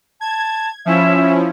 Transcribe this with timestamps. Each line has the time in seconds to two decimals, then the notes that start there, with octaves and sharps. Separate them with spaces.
0.21 A5 G#6
0.86 F3 C#4 E4 E5